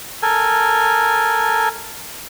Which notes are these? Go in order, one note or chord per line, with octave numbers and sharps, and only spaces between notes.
A4 A#4 G#5